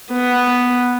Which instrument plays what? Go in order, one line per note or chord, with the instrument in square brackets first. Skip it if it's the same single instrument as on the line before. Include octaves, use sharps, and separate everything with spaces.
[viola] B3